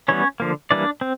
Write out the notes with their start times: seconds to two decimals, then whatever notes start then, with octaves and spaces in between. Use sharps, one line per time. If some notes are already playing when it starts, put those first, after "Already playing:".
0.08 E3 G3 B3 C#4 C#5
0.40 D3 F3 A#3
0.71 E3 G3 A#3 D4 D5
1.01 C4